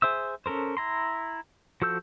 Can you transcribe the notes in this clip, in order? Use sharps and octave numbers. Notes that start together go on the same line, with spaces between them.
G#4 C5 E5 E6
C#4 A4 A#4 C5
E4 A#5 C6
F3 F#4 A4 E6 G6